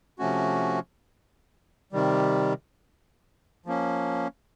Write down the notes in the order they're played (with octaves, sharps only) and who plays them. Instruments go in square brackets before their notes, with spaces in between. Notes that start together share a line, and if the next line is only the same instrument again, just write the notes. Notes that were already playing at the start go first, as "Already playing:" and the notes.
[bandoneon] C3 F3 A3 C#4 F#4
C3 D#3 G3
F3 A#3 C#4